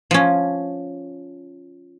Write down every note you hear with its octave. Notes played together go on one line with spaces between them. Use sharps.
F3 C#4